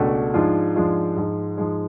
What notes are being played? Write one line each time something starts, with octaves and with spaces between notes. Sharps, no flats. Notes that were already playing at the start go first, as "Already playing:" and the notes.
Already playing: C#2 B2 A3 D4 F#4
G#2 F3 G#3 D4 F4
G#2 F3 G#3 D4 F4
G#2 F3 G#3
G#2 F3 G#3